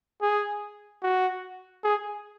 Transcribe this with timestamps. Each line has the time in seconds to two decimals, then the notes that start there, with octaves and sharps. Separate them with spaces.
0.22 G#4
1.03 F#4
1.84 G#4